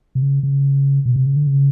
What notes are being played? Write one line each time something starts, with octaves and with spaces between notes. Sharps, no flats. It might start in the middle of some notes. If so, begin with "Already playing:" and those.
C3
C#3
C#3
B2
C3
C#3
D3
C#3